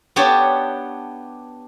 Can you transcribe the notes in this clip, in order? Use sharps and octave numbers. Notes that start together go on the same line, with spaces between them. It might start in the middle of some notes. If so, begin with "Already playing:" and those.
B3 D4 G4 C#5 A5